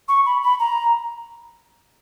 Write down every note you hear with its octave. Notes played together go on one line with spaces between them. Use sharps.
C#6
B5
B5
A#5